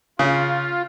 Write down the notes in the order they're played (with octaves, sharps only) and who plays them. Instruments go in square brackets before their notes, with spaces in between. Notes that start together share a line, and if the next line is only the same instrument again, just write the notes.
[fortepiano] C#3 [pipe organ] F4